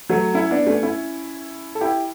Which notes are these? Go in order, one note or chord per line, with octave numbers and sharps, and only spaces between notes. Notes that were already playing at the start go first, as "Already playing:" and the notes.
F#3 A3
C#4 E4
B3 D4
A3 C#4
C#4 E4
A4
E4 G4